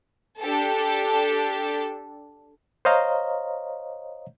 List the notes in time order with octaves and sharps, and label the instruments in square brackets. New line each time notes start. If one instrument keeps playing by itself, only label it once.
[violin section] D4 G4 A4
[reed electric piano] C5 C#5 D#5 F5 A#5